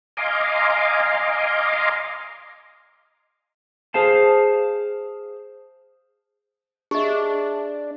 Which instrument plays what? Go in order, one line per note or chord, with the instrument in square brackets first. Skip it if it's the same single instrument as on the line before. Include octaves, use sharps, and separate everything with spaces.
[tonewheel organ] D#5 F5 G#5 A#5 C6 D6
[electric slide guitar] G#4 C5 F5 A5
[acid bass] D4 [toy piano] G4 D#5 [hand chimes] G#4 E5